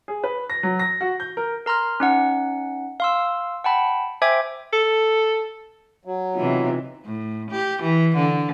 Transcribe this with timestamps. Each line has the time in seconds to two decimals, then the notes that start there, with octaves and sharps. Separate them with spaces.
0.08 G#4
0.24 B4
0.50 A#6
0.63 F#3
0.79 A#6
1.01 F#4
1.20 G6
1.37 A#4
1.66 A#4 A#5 C6 F6
2.00 C#4 D#4 F#5
3.00 F5 C6 E6
3.64 F#5 G5 A5 B5
4.22 C5 E5 G5 G#5 D6 G#6
4.73 A4
6.05 F#3
6.35 C3 E3 B3 D#4 F4
7.05 A2
7.50 G4
7.82 E3
8.15 D3